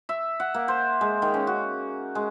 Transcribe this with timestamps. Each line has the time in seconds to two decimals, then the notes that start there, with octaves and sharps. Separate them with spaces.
0.09 E5
0.40 F#5
0.54 A#3
0.68 C5
1.01 G#3
1.22 D#3
1.34 C#4
1.47 F#4
2.15 G#3